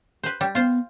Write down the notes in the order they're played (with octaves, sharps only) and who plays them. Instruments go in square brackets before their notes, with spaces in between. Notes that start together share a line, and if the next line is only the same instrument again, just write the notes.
[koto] B4 C5
G3
[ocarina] B3 [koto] F4 C5